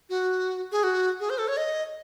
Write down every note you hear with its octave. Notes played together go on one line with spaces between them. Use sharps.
F#4
G#4
F#4
G#4
C5
A4
C#5
D#5